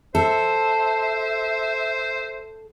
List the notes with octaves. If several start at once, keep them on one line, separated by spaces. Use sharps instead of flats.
A4 C5 E5